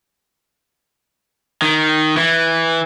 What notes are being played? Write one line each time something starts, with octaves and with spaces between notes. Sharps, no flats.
D#3
E3